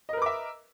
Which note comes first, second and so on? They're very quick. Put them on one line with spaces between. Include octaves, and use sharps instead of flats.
D#5 A#4 B4 D6 E5